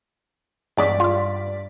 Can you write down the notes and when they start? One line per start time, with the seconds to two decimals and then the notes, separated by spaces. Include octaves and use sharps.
0.77 E2 G2 G#3 C#4 D5 B6
1.00 F4 F5